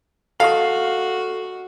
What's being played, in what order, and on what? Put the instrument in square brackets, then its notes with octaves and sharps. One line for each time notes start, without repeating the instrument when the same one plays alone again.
[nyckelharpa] F#4 [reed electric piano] A4 D#5 [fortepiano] F5